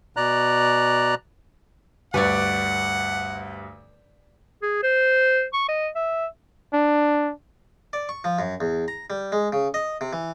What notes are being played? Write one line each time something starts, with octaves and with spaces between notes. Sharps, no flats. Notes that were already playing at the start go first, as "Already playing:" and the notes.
B2 D5 A#5 F#6
D2 G2 B4 C#5 D5 F#5
G#4
C5
C#6
D#5
E5
D4
D5
C#6
F3
F#2
E2
A#5
G3
G#3
C#3
D#5
C3
E3